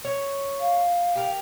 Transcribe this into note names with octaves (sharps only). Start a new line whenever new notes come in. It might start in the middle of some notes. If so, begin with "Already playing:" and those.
C#5
F5
G4 A#4